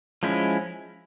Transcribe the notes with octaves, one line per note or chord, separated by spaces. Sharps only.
F3 G#3 C#4 E4